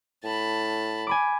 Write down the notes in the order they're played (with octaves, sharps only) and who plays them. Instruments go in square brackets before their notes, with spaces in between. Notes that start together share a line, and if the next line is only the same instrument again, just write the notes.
[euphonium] A2 [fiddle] A5 B5
[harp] G#5 B5 D6